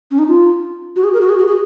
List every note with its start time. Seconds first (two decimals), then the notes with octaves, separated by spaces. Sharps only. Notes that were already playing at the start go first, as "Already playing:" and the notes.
0.11 C#4
0.19 D#4
0.28 F4
0.96 F#4
1.04 G#4
1.14 A#4
1.21 F#4
1.29 G#4
1.39 F#4
1.47 G#4